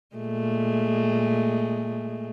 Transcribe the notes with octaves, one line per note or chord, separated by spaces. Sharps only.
A#2 G#3 A3